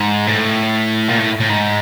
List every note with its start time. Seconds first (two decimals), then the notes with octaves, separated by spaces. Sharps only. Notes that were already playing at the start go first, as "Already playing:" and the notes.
Already playing: G#2
0.27 A2
1.09 A#2
1.19 A2
1.40 A2
1.50 G#2